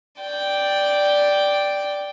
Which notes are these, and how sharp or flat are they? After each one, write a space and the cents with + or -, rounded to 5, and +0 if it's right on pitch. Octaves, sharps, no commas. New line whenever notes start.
D5 +0 G5 +0